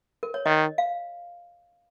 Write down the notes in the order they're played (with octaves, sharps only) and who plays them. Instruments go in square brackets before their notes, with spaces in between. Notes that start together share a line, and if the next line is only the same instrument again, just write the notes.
[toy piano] A#4
C#5
[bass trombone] D#3 [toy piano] D#5
[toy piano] F5